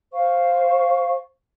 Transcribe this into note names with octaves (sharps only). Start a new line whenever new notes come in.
C5 F5 C#6